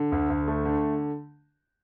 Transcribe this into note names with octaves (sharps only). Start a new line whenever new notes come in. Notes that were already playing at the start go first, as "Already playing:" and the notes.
Already playing: D3
D2
D2
A3
D3